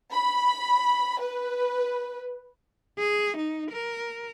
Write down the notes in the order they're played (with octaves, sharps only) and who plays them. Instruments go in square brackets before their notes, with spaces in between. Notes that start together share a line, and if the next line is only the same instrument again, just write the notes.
[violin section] B5
B4
[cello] G#4
D#4
A#4